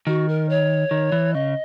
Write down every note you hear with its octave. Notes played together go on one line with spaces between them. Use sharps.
D#3 F#4
A#4
C#5
D#3
E3
C#3 D#5